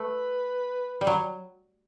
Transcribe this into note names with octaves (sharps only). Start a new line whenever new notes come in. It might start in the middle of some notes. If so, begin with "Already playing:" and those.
Already playing: A3 B4
G3
F#3